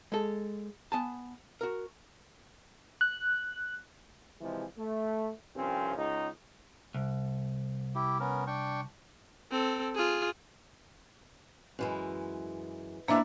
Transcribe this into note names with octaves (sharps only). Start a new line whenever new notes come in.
G#3 A4
B3 G#5 A5
F#4 A#4
F#6
C3 E3 F3 G#3
A3
C2 G2 F3 C4 C#4
C#2 D#4
C2
E4 G4
B3 C#4 A#4
D4 G5 C#6
C4 A4
F4 G#4
F#2 E3 G#3
F3 G#3 A#3 B3 D4 E4 E5 D6